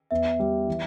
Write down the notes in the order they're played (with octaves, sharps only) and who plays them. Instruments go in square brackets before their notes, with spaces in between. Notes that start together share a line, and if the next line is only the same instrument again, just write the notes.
[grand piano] E2 [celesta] E5
[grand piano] G3
E3